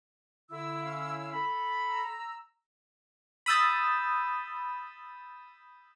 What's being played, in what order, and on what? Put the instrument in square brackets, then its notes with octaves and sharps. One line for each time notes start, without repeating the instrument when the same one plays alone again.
[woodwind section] D3 E4 E6
[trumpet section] C#4 F5
A4 B5
[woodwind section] A#5 E6
[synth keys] B5 D#6 E6 G6 A6